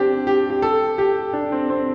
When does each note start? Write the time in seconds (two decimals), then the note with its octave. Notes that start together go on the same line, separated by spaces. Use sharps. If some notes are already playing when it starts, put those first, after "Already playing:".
Already playing: C4 D4 G4
0.27 G4
0.50 G4
0.62 A4
0.98 G4
1.33 D4
1.52 C4
1.70 C4